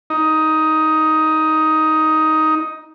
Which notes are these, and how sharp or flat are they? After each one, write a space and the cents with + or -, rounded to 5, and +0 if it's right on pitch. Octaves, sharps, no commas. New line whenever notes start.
D#4 +10